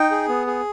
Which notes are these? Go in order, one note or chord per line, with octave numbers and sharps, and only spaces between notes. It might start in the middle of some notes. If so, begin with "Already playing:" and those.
Already playing: D#4 G5
G#4
B3
G#4